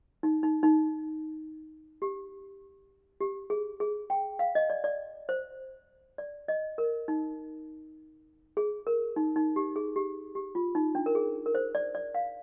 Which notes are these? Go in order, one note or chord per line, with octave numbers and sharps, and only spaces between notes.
D#4
D#4
D#4
G4
G4
G#4
G#4
G5
F5
D#5
D5
D5
C5
D5
D#5
A#4
D#4
G#4
A#4
D#4
D#4
G4
G#4
G4
G4
F4
D#4
D4
A#4
G#4
A#4
C5
D5
D5
F5